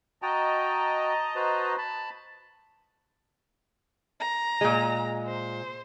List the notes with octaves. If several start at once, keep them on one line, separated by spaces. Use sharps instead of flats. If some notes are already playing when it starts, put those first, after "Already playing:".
F#4 D#5 G5 A5 A#5
F#4 B4 C5
A5 B5
A#5
A#2 G#3
C5